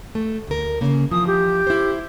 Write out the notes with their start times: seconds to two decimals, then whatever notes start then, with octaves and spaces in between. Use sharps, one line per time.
0.15 A3
0.47 D2 A#4
0.81 C#3 A#3
1.11 E3 F3 D#6
1.27 G4
1.67 E4 C5